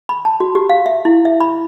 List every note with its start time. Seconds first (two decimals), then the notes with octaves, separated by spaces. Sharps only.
0.09 B5
0.25 A5
0.40 F#4
0.55 G4
0.69 F5
0.86 E5
1.05 E4
1.25 E5
1.40 B5